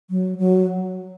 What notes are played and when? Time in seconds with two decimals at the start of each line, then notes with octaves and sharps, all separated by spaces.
0.10 F#3
0.38 F#3